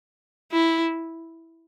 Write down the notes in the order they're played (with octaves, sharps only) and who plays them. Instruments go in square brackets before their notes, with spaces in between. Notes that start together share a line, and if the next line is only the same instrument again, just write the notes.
[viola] E4